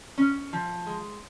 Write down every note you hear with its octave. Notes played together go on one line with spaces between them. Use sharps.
C#4
F3
G#3